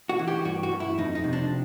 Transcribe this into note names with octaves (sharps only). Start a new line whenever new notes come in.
F#4
E3
G4
G2 F#4
F#4
G2
E4
F2 D#4
D#4
C3
D4